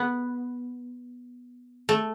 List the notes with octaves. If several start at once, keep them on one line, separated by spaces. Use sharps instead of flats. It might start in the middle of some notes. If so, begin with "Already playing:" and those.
Already playing: B3
A3